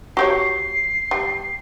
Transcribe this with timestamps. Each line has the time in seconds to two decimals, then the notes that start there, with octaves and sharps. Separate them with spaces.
0.17 F#4 G4 C#5 C7
1.11 G3